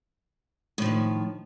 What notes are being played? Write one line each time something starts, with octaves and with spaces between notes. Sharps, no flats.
A2 D#3 F3